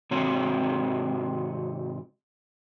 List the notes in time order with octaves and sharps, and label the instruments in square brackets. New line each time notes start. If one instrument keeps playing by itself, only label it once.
[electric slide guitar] G#2 C3 C4 F#4 C#5